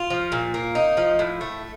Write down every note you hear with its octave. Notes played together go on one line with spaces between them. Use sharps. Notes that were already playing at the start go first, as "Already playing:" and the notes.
Already playing: F4
F3
A#2
A#3
D#4
F3
A2
A3